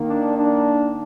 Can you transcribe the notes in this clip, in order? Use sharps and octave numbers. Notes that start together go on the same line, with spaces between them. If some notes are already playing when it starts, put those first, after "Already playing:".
Already playing: D#3 A#3
D4
D4